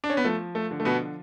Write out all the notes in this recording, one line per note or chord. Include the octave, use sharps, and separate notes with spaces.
D4
C#4
B3
F3 A3
A3
D3
A3
B2 B3